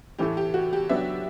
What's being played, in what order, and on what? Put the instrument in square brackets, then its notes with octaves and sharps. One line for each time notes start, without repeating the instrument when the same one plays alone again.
[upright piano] A2 E3 A3 [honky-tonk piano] G4
[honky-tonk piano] G4
F#4
G4
[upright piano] F#3 B3 D4 [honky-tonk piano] E5